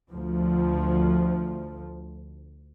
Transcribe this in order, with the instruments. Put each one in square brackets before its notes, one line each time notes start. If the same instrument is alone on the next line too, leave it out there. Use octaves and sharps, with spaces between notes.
[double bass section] D2 F3